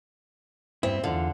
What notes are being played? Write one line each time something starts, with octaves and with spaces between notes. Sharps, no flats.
G2 B3 C4 E4
E2 D3 F4